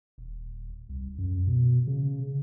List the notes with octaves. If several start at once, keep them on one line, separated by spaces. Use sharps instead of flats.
D#1
C2
F#2
B2
C#3